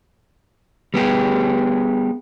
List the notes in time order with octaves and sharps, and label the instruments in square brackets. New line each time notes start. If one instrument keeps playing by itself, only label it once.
[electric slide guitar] G3 B3 G4 G#4